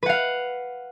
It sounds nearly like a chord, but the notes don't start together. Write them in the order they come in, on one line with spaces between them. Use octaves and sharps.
B4 F#5 F5